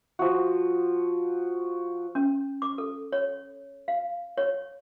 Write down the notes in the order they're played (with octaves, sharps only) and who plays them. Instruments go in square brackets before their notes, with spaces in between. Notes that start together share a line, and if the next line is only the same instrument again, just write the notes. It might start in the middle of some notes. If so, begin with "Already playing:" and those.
[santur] F3 F#4
[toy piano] C#4
D6
A4
C#5
F5
C#5